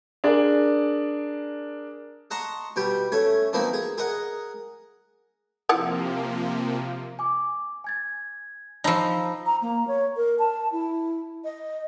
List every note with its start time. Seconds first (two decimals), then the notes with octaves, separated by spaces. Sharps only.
0.24 D4 G#4 A#4 D5
2.31 D#5 F#5 A5 A#5 C6 C#6
2.76 B2 G3 G4 G5
3.12 A3 C#4 G#5
3.53 B2 F3 A#3 C4 D#4
3.73 G#4
3.98 G#4 A#4 D#5 F#5
5.69 C3 F3 A#3 E4 F4 F#5
7.19 G#5 D6
7.84 G#5 G#6 A6
8.84 F3 D#4 A5 B5 E6
9.46 A#5
9.62 A#3
9.87 C#5
10.16 A#4
10.39 A5
10.72 E4
11.44 D#5